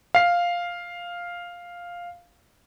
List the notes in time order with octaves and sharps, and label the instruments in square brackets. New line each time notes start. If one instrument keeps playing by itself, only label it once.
[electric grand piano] F5 C7